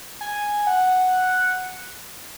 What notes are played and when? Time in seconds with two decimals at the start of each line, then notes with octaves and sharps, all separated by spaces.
0.21 G#5
0.67 F#5